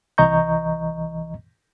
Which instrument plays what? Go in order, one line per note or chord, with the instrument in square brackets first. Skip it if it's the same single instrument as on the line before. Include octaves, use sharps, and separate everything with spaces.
[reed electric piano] C2 E3 D#5 A#5 C#6 G6